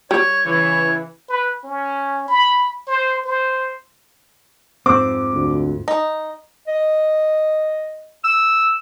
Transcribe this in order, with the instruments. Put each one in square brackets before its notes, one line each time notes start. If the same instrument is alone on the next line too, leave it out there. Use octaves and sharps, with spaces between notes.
[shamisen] G3 [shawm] C#5
[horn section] C#3 E3 [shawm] C#5
[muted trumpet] B4
C#4
B5
C5
C5
[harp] F2 G#2 F#6 [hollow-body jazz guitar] C4 [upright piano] D6
[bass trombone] D2
[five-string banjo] D#4
[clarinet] D#5
E6